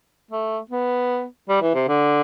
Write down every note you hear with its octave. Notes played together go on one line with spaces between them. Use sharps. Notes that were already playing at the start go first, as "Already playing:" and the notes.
A3
B3
G3
E3
C3
D3